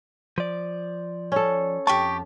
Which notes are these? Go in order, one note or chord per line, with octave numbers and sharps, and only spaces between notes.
F3 D5
C#4 A4
F2 G4 G5 A5 C#6